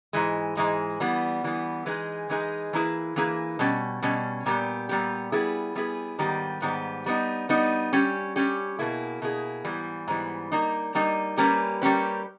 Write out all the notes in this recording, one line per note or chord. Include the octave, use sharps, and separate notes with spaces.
G#2 E3 G#3
G#2 E3 G#3
E3 G3 B3
E3 G3 B3
E3 G#3 D#4 G#4 B4
E3 G#3 D#4 G#4 B4
E3 A#3 E4 G#4 B4
E3 A#3 E4 G#4 B4
B2 G3 C#4
B2 G3 C#4
A#2 G3 B3 G4
A#2 G3 B3 G4
G3 B3 E4 G#4 B4
G3 B3 E4 G#4 B4
G#2 D#3 G3 B3 G4
G#2 D#3 G3 B3 G4
G3 B3 D#4
G3 B3 D#4
G3 C#4 G4
G3 C#4 G4
B2 A#3 E4 G#4
B2 A#3 E4 G#4
G#2 E3 G3 B3
G#2 E3 G3 B3
G3 A#3 D#4
G3 A#3 D#4
G3 A#3 C#4 G4 B4
G3 A#3 C#4 G4 B4